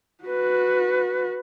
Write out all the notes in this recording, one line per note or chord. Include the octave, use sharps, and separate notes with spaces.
F#4 B4